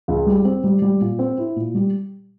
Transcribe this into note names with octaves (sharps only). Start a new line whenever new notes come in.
C#2
G3
C4
G3
G3
A#2
C4
E4
A#2
G3